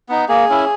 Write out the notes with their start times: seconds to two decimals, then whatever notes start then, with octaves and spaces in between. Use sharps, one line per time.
0.09 B3 D#4
0.29 A#3 G#4
0.49 C#4 E4